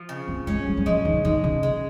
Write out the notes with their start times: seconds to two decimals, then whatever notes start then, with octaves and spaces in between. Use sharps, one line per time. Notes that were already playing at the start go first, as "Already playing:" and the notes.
Already playing: F3
0.09 C#3
0.28 C4
0.47 G#3 C#4
0.67 G3
0.77 G3
0.86 F3 G#3
1.05 D#3
1.25 D#3 G#3
1.44 C#3
1.63 G#3